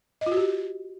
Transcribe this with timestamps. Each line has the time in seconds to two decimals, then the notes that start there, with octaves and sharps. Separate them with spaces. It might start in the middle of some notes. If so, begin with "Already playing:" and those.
0.21 D#5
0.26 F4
0.32 F#4
0.37 G4